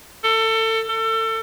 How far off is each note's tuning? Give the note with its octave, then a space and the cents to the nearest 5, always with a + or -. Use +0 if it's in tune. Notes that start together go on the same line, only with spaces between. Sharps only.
A4 +25
A4 +30